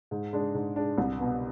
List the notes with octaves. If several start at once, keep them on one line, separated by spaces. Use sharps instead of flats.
G#2
G#3 D4
G#2
G#3 D4
C2
B2 B3